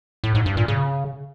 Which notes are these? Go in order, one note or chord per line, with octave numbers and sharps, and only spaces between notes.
A2
G#2
G2
A#2
C#3